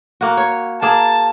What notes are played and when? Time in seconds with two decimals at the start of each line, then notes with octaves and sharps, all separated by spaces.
0.21 A#3 F#4
0.37 C#5
0.82 A#3 G#4 A5